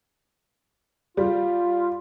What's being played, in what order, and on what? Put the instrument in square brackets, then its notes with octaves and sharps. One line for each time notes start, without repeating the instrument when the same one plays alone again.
[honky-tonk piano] G3 [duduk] F4